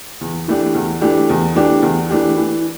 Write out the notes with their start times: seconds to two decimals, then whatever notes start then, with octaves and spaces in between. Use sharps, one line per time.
0.21 E2
0.48 E3 A3 D4 G4
0.75 E2
1.01 E3 A3 D4 G4
1.29 E2
1.56 E3 A3 D4 G4
1.82 E2
2.10 E3 A3 D4 G4
2.37 E3